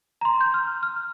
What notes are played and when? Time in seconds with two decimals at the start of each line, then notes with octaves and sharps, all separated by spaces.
0.21 A#5
0.25 C6
0.41 G6
0.54 F6
0.83 F6